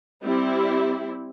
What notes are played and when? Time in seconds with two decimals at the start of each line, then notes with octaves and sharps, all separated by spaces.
0.23 G3 C4 E4